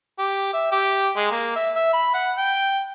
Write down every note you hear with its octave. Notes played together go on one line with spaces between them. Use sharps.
G4
E5
G4
G#3
A#3
E5
E5
B5
F#5
G5